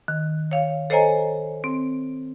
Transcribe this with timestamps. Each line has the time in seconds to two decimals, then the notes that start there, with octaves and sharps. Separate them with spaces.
0.08 D#3
0.51 C#5 F5
0.90 A4 C5 C#5 D#5 G#5 A#5
1.64 C4